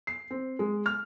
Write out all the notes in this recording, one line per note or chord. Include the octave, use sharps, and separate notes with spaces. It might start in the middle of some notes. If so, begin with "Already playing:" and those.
C7
C4
G#3
F6